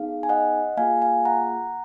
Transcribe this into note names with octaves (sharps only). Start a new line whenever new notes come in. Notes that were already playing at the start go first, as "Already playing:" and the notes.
Already playing: B3 D#4 G#4 F5
G#5
D#5 F#5
A#3 F4 G#4 F5 G#5
F5 G#5
F#5 A#5